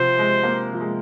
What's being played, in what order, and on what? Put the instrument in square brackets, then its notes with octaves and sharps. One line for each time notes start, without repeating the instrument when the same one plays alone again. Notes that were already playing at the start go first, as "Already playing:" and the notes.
Already playing: [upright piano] C3 F3 [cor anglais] C5
[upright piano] G#3
A#3
F3
G#3